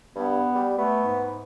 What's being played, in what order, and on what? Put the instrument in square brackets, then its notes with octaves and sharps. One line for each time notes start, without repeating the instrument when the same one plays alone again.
[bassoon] G2 [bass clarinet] B3
[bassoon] G3
[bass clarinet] A3 [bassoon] B3
[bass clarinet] G#2